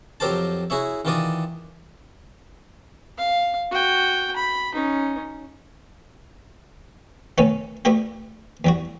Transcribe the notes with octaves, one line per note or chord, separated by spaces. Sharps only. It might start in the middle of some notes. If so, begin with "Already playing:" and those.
F2 F#3 G4 A#4 C5 A5
E4 F#4 G#4 C#5 E5
D#3 E3 F4 F#4 D5 D#6
F5
F#4 G5
B5
C#4 D#4
B2 D#3 A3 B3 C#4
A3 B3 D4 F#4 G4
E2 G3 F#4